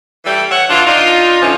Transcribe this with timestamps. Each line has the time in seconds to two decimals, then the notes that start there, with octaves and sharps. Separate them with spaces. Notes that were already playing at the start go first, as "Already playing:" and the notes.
0.25 E3 G3 A3
0.51 C#5 E5 F#5
0.69 E3 D4 F4
0.86 D4 D#4 F4
1.41 D3 E3 F3 C#4 D#4